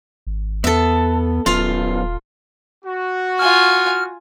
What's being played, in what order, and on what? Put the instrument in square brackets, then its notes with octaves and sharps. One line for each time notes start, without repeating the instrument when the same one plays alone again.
[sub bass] G#1
[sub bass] E2 [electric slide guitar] B3 [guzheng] A4 E5
[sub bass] D#1 [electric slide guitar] F#2 B3 [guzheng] F4 F5
[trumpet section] F#4
[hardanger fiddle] F4 G#5 [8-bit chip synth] F6